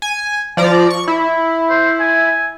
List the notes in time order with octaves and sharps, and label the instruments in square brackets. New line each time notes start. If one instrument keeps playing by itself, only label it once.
[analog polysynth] G#5
F3 D5 A#5
C#6
[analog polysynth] E4 [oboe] B5
[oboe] C5
G#5